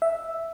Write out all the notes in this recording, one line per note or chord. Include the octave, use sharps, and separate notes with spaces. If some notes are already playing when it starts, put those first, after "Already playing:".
E5